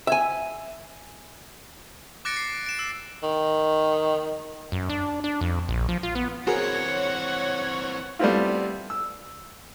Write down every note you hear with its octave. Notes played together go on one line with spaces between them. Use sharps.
E5 G#5
D6 F#6 A6 A#6 C#7 D7
C7
D7 E7
E6
D#3
F#2
D4
D4
F2
A#1
F3
F4
B3
E3 C4 F#4 G#4 A#4 C#5 F#5
G3 A3 B3 C4 E4 F4
E6